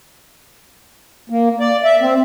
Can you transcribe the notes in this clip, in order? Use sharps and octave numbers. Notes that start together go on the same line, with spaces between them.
A#3
D5
E5
C4